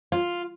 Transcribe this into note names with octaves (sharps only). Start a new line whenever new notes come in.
F4